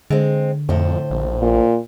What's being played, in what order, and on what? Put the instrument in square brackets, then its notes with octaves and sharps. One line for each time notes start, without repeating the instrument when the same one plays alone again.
[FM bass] D3 [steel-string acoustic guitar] G#3 C4
[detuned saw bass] F2 [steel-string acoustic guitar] A2 C5
[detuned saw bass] A#1
[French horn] A#2